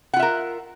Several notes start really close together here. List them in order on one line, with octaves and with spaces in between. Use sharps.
F#5 F4 E5 A#4